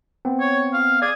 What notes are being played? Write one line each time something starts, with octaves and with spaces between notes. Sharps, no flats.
B3 C4
C#5
F5
G#4 D5